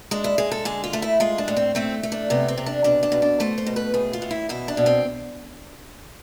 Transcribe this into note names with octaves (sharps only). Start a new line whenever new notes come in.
G#3 D4
E4
G#3 G#4
A4
D3 G#4
F4
A3
E4
G#3 F4
D4
A2
C4
A3 C4
A3
D4
C3 B3
C4
C3
D4
B2 D4
D4
B2
D4
A3 C5
C5
B2
B4
A2 G#4
F4
A2
E4
B2 E4
D4
B2
C4